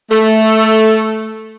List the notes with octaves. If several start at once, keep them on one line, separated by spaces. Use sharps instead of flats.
A3